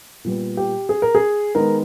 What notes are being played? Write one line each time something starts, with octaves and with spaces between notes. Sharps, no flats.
A#2 G3 B3
G4
G#4
A#4
G#4
D#3 G#3 B3 A#4